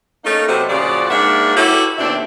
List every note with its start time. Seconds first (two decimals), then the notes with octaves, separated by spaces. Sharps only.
0.25 A3 A#3 C#4 D#4
0.48 C3 F#3 A3 B3 C5
0.69 A#2 C#3 F3 F#4 D5
1.10 G#2 A#3 D4 A#4 E5 F#5
1.57 E4 F#4 G4 A4 B4 C#5
1.98 D#2 B2 A3 C4 D4 E5